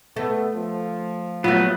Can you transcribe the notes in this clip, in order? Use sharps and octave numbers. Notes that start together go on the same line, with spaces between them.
A3 B3
F3
F#3 G3 A3 B3 F4